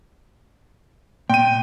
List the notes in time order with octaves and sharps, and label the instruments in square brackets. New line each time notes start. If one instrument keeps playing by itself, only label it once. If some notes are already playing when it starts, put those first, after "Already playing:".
[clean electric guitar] A#2 [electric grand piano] G5 D#7